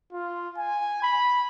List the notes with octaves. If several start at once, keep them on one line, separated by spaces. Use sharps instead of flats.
F4
G#5
B5